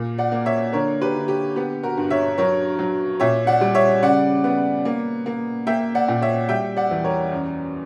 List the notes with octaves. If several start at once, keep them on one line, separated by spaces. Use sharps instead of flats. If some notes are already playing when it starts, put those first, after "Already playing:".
Already playing: A#2 A#3
D5 F#5
A#3
C#5 E5
D3 A#4 C#5
G4 B4
D3
G4
B3 G4
F#4 A#4
G2
C#5 E5
F#3 A#4 C#5
F#3
A#2 C#5 E5
D5 F#5
G3
C#5 E5
C#3 D5 F#5
B3
A#3
A#3
A#3 E5 G5
D5 F#5
A#2
C#5 E5
G3 E5 G5
D5 F#5
E2
A#4 C#5
F#2